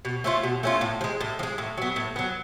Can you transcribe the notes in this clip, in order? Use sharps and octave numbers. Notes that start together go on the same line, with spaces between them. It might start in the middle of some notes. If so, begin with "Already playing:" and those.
B2
A3 C#4 F4
B2
A3 C#4 F4
A2
F3
G#3
A2
F3
G#3
A2
F#3 B3
A2
F#3 B3